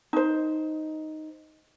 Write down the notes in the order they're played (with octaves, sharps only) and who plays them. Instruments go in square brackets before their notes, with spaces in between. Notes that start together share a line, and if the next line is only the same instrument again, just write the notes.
[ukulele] D#4 C5